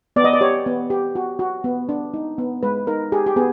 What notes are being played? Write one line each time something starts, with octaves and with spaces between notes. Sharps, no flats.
B3 D5
D#5
D5
G4 C#5
B3
G4
F#4
F#4
B3
D4
D#4
B3
G#3 B4
D#4 A#4
G4 G#4
G4
B3 G#4